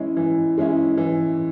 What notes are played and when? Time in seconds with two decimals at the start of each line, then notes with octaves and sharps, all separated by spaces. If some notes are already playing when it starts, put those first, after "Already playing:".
Already playing: E3 G#3 C#4 E4
0.17 E3
0.58 G#3 C#4 E4
0.97 E3